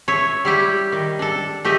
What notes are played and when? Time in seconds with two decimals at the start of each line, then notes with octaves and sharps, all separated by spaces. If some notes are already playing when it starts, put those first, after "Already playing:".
0.08 C#5 E5
0.45 G3 E4 G4
0.92 D#3
1.19 D4 A4
1.65 A3 G4 D#5 E5